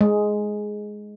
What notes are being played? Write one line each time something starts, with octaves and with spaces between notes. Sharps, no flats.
G#3